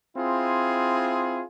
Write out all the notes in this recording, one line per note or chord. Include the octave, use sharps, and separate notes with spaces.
C4 E4 F4 G#4